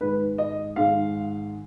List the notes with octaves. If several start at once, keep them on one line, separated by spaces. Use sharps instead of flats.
G#2 D#3 G#3 B4
D#5
G#2 D#3 G#3 F5